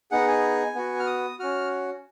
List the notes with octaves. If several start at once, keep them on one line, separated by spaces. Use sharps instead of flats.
B3 D#4 G#4 F#5
G#5
B3 F#4
F6
D#6
C#4 F#4 F6